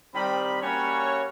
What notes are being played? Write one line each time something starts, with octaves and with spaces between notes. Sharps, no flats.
D#3 G3 C4 B5
G3 A#3 C#4 F#4 C#5